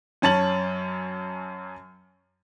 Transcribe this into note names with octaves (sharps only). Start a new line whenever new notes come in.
F#2 C#4 A5 A6 F#7